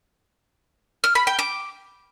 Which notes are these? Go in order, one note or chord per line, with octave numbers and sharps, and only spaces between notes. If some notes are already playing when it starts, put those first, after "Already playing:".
F6
B5
G5
D6